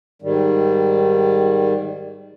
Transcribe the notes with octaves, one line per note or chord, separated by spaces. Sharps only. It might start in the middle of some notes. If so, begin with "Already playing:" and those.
G#2 D#3 G3